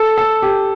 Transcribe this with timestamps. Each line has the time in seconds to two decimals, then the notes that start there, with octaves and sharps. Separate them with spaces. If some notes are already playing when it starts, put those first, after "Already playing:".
Already playing: A4
0.18 A4
0.42 G4